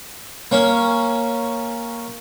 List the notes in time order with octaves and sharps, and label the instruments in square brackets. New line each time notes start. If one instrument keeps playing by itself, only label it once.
[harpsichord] A#3 C#4